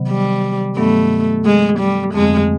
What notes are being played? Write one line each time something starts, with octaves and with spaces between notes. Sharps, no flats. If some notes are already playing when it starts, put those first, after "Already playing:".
Already playing: C3 D#3 F#3 B3
G3
G2 D#3 F#3 A3 B3 D4
G#3
G3
F2 D3 F3 G#3 A3 C4